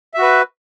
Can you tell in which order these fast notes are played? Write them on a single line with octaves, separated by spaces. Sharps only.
E5 F#4 B4